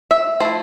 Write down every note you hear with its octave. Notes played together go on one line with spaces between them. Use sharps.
E5
F3 A3 E4 C5